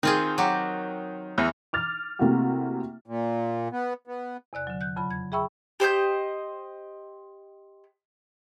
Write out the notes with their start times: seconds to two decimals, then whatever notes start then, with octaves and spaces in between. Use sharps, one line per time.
0.03 D#3 C4 F4 G#4
0.38 F#3 F#4 G4
1.38 E2 E3
1.73 D6 F6 A6
2.19 C3 A3 A#3 E4 F#4 G4
3.06 A#2
3.72 B3
4.07 B3
4.53 E2 C3 D5 F#6
4.67 D3 F#3
4.81 F#6 G6
4.96 F2 C#3 F#3 B5
5.11 G#6
5.32 G#4 E5 G5 B5 C#6 E6
5.80 G4 C5 D#5 G6